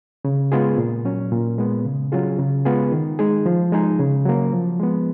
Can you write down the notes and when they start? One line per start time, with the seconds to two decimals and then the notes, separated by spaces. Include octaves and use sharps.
0.25 C#3
0.52 G#3 B3 F4 G#4
0.78 A#2
1.05 F#3 C#4
1.31 A#2
1.58 G#3 B3
1.85 C#3
2.12 F#3 C#4 F4 G#4
2.39 C#3
2.65 G#3 B3 F4 G#4
2.92 D#3
3.19 G#3 D#4 G#4
3.46 F3
3.72 G#3 D#4 G#4
3.99 C#3
4.26 F#3 A#3
4.53 F3
4.80 G#3 B3